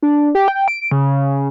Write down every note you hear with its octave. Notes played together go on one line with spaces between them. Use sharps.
D4
G4
G5
D7
C#3